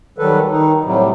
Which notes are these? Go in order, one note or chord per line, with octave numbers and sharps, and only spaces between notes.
D#3 F#3 G3 A4 B4
D#3 D#4
A2 C3 F#3 G3